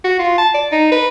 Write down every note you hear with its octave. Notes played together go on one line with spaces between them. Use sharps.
F#4
F4
A5
D5
D#4
B4